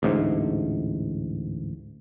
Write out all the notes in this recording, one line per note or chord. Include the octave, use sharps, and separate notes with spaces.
A1 D2 G#2